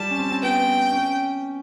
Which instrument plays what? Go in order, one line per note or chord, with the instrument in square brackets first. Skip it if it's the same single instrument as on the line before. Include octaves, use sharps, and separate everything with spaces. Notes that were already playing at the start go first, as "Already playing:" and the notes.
Already playing: [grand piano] G3 [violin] A5
[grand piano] C#4
C4
C4
[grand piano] B3 [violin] G5
[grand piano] C#4